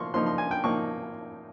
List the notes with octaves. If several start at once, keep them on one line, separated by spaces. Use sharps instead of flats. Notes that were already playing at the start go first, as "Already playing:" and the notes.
Already playing: F3 A#3 C6 C#6
F3 A#3 D#4 C6
C6
G#5
G5
F3 A#3 D#4 C#6